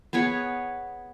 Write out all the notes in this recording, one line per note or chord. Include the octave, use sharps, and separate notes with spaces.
B3 G#4 B4 C#5